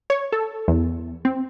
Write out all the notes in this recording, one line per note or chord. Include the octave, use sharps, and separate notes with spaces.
C#5
A4
E2
C4